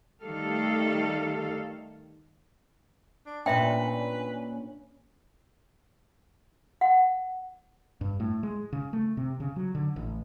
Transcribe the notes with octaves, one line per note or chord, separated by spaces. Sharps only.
D#3 G3 A3 A4 F5
D4
A#2 C#4 D4 B4 E5 G5
F#5
G2
A2
G#3
C#3
A3
C3
C#3
F#3
D3
A1